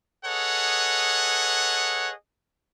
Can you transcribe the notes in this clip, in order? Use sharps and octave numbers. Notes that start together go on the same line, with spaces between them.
G#4 A4 B4 C#5 D#5 F#5